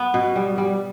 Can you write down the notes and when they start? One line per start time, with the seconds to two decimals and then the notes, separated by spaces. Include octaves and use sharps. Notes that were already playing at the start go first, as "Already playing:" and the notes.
Already playing: B3
0.14 B2
0.36 G3
0.58 G3